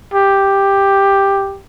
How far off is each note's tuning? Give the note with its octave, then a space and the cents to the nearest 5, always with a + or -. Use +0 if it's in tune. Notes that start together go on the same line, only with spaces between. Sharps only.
G4 +5